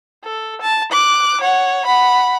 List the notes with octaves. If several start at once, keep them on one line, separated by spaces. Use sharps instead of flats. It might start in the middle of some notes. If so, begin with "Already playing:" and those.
A4
A5
D6 F#6
C#5 F#5
F#5 B5